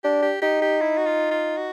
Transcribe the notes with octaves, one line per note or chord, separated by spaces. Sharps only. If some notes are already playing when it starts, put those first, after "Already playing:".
D4 G4
G4
D#4 G4
G4
E4
F#4
F4
F4
F#4